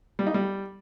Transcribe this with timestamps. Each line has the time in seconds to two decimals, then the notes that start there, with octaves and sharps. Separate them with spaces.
0.19 G3
0.27 D#4
0.34 G3